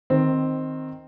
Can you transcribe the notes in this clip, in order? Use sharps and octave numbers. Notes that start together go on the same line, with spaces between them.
D#3 C4